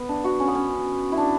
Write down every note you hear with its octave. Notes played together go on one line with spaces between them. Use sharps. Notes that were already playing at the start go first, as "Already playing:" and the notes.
Already playing: B3
D4
F#4
C#4
B3
C#4
E4
D4